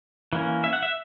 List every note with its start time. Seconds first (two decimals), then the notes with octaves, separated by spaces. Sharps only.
0.33 E3 A#3 C#4
0.64 E5
0.73 F#5
0.83 E5